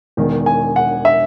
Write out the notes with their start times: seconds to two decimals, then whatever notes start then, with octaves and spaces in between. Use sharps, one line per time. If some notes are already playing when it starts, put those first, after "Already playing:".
0.17 E1 E2 D#3
0.46 G#5
0.76 F#5
1.05 E5